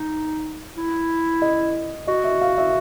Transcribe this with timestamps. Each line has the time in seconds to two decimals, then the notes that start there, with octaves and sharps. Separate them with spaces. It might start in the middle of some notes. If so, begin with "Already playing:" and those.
Already playing: D#4
0.77 E4
1.42 D#5
2.07 F#4 D#5
2.24 E5
2.42 F5
2.58 E5